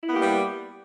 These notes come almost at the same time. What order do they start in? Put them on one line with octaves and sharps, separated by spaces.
E4 B3 A#3 G4 G3